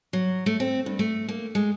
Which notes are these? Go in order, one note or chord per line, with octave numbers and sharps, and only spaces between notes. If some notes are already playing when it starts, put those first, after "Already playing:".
F#3
A3
C4
G2
A3
A#3
G#3